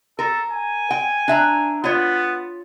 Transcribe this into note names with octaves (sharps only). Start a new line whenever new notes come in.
A4 A#4
G#5
G5
D4 E5 A#5
B3 F4 C#5